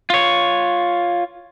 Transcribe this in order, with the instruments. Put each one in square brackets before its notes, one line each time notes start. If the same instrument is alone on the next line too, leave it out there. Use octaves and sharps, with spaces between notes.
[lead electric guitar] F4 C#5